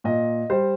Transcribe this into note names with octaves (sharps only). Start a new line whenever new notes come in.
A#2 D#5
G3 C5